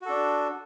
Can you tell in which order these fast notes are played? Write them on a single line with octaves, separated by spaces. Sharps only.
F#4 A4 D4